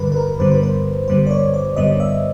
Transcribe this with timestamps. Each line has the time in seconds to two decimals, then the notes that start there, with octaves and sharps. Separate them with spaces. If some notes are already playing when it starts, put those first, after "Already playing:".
Already playing: G2 D3 G3 A#4 B4
0.12 B4
0.16 A#4
0.39 G2 D3 G3 B3 C5
0.52 B4
0.63 C5
1.08 G2 D3 G3 B3 C5
1.27 D5
1.31 C#5
1.54 D5
1.76 G2 D3 G3 B3 D#5
2.00 E5